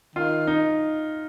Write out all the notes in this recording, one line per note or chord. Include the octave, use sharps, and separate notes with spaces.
D#3 F4
D#4